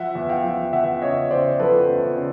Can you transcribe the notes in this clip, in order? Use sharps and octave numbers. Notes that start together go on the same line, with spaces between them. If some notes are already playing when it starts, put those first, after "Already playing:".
Already playing: F3 E5 F#5
E2
F5 G5
F3
E2 E5 F#5
C#3 C#5 D#5
C#3 C5 D5
F3 A4 B4
E2
C#3